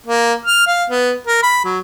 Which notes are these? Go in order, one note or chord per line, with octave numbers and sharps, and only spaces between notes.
A#3
F6
F5
B3
A#4
B5
F#3